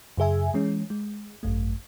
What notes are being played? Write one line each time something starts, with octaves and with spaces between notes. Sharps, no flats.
F#2 C#3 G#4 E5 G#5
E3 G#3 C#4
G#3
G#1 F#2 A3